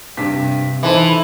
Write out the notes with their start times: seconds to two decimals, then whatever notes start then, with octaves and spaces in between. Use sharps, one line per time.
0.17 G2 C3 B6
0.83 E3 D#4 A4 C5